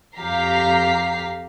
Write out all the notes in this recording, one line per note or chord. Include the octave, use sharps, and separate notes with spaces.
F2 G4 F5 A#5 B6 C7